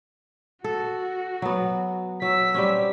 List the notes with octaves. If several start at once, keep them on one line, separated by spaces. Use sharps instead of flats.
F#4 A4
F#3 B3
F#3 E6 B6
G3 C4 C#4